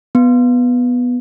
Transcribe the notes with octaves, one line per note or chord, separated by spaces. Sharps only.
B3